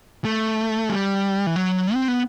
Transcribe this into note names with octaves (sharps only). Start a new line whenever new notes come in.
A3
G3
E3
F#3
C4
B3